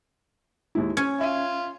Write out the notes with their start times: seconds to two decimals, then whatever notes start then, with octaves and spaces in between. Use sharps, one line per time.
0.75 D#2 G#3 E4
0.97 C#4 G#6
1.21 F4 E5 D#7